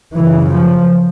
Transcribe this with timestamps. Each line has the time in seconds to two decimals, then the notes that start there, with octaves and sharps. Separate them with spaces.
0.15 F#2 C#3 E3
0.51 F3